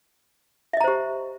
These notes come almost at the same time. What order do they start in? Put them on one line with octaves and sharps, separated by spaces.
E5 D#5 A#5 C5 G4